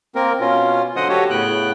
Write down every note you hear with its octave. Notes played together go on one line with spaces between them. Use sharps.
A#3 C4 A#4
B2 C#4 F4
D3 F#3 C5 D#5 F#5 D#6
F#4 G4 A4 C#5
A2 C#3 B3 G5 F#6